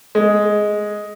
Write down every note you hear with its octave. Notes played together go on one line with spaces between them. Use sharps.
G#3